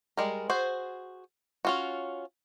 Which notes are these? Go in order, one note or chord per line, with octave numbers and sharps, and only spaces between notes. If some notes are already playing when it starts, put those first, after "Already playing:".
G3 G#3 A#4
F#4 G#4 C5
C#4 F4 F#4